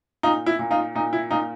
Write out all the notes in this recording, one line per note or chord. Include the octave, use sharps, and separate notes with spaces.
A#2 D#4 F4
E4
A#2
D#4 F4
A#2 D#4
E4
A#2 D#4 F4